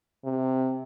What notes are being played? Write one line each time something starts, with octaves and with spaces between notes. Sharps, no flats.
C3